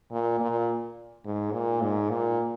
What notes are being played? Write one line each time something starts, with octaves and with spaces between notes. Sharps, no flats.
A#2
A#2
G#2
A#2
G#2
A#2